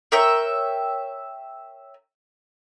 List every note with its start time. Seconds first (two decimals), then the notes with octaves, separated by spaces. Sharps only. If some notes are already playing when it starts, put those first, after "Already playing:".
0.12 A#4 C#5 E5 G5